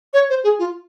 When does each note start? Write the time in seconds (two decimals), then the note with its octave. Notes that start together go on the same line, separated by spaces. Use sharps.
0.14 C#5
0.30 C5
0.44 G#4
0.59 F4